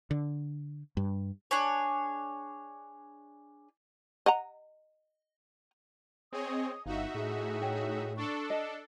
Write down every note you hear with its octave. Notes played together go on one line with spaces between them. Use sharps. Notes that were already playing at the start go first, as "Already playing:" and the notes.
D3
G2
D4 G#4 C#5
D#5 F#5 A#5
C4 G#4 C#5 D#5 D#6
G1 D#4 F#4 E5 F5
A2 G#4
C#5 G5
D4 A4 C#6
D#5 A5